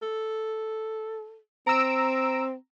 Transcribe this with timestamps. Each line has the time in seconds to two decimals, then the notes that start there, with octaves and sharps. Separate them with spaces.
0.02 A4
1.67 C4 A#5 E6 D7